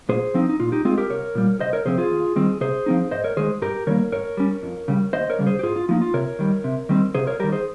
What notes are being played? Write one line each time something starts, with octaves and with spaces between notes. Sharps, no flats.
A#2 G#4 C5
F3 C4 D#4
D#4
A#2 F4
D#4 G4
G#3 C4 F4 G#4
G4 A#4
C2 A#4 C#5
A#2 G3
C2 C5 D#5
A#4 C#5
C3 F3 C4 G#4 C5
F4 G#4
D#2
D#3 G3 C4
C3 G#4 C5
F3 C4 D#4
G#2 C5 D#5
A#4 C#5
D#3 G#3 G#4 C5
G2 G4 A#4
D#3 G3 A#3 A#4 C#5
G2 A#4 C#5
G3 C#4
F2
C#3 G3
D#2 C5 D#5
A#4 C#5
C#3 G3
G#4 C5
G4
G#2 F4 G#4
F4
F3 A#3 D#4 F4
F4
C3 A#4 C#5
D#3 G3
C3
D#3 G3 C4
C3 G#4 C5
A#4 C#5
D#3 G3 G4 A#4
G#4 C5